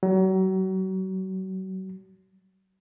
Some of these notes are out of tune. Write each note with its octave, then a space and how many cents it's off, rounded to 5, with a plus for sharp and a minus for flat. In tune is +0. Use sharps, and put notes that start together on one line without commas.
F#3 +35